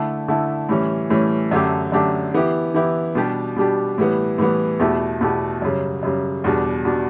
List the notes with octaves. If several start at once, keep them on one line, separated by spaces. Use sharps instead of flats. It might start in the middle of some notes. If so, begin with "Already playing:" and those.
Already playing: D3 A3 E4
D3 A3 E4
A2 E3 G3 C#4
A2 E3 G3 C#4
F#2 D3 A3 D4 G4
F#2 D3 A3 D4 G4
E3 B3 E4 G4
E3 B3 E4 G4
B2 G3 D4 G4
B2 G3 D4 G4
A2 E3 G3 B3
A2 E3 G3 B3
E2 B2 A3 E4 G4
E2 B2 A3 E4 G4
F#2 C#3 G3
F#2 C#3 G3
E2 B2 G3 D4
B2 G3 D4